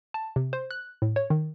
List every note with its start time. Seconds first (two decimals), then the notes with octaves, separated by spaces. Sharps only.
0.14 A5
0.36 C3
0.53 C5
0.71 F#6
1.02 A2
1.16 C#5
1.30 D#3